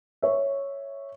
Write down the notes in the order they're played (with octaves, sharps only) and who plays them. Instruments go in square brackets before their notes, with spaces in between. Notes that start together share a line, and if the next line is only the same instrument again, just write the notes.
[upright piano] C#5 E5